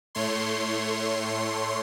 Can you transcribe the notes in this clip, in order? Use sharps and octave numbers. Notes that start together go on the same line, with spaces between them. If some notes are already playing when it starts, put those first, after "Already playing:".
A2 A3 C#5 C6